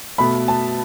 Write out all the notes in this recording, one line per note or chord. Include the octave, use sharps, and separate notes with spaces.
B2 A3 B5
A5